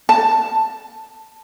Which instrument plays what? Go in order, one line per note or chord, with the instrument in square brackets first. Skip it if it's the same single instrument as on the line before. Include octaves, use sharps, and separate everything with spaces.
[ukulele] A5